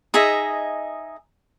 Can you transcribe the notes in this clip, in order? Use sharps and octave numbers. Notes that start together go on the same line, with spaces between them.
D#4 G#4 D#5 E5